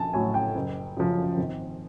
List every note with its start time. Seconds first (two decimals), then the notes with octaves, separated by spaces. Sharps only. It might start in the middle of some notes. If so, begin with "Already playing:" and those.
Already playing: A#1 G#5 A5
0.13 A2 F#3 G#5
0.34 G5
0.55 F#1
0.97 F#2 C#3 F3
1.38 G#1